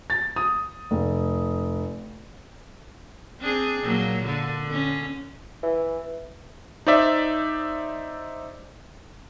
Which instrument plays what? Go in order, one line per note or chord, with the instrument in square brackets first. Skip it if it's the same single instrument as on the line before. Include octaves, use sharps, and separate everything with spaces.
[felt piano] A6
D#6
F1
[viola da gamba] C4 D4 G#4
A#2 F#3 A#3
D3
D3 C#4
[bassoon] E3
[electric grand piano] D#4 C5 D5 E5